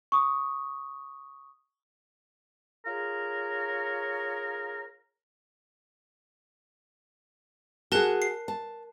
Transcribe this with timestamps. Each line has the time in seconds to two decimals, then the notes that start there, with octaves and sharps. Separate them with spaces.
0.12 C#6 D#6
2.86 F4 G#4 A#4 C#5
7.92 F#4 G#4 A#4 A5 F#6
8.22 C7
8.48 A5